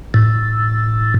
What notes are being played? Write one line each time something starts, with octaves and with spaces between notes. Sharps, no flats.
A2